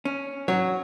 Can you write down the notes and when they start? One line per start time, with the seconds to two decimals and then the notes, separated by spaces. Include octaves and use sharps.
0.05 C#4
0.48 F#3 C#5